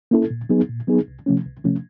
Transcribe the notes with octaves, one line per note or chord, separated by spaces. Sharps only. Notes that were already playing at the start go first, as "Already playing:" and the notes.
A#3 C#4 E4 A4
A#2
F#3 B3 D#4 G#4
A#2
F#3 B3 D#4 G#4
C2
C3 F3 A3 C#4
C2
C3 F3 A3 C#4